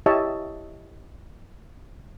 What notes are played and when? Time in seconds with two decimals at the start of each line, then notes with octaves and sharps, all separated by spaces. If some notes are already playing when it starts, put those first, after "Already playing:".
0.06 E4 G4 C#5 D#5 E5 A5